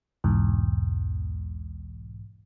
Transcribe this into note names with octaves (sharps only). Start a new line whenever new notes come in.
B1 E2 G#2